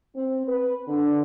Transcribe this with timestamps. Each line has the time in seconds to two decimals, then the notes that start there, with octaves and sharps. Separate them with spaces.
0.15 C4
0.46 B4
0.88 D3